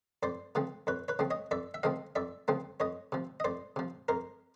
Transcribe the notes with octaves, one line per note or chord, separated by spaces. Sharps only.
F2 C5 D5
C#3 F3 A3 C4
F2 B4 C#5
B4 C#5
C#3 F3 A3 C4
C#5 D#5
F2 D5 E5
E5
C#3 F3 A3 C4 D#5 F5
F2 D5 E5
C#3 F3 A3 C4
F2 C#5 D#5
C3 F3
D#5
F2 C5 D5
C3 F3
F2 A#4 C5